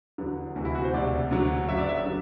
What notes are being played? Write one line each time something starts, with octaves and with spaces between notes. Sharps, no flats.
E2 D3 F#3
D2 C3 E3 F#4
E4
F#4
C5
E1 D2 C3 D5
D2 D3 F#3
F#1 F#2 F#3 E5
D5
E5
D3 F#3